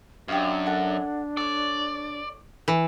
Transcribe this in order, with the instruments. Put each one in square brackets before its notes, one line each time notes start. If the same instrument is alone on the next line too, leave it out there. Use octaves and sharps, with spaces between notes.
[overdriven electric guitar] F#2 [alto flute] D4 [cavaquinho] G4 D#5 F5
[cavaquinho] A4 F#5 A5
[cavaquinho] A4 C#5 [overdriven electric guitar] D5
[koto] E3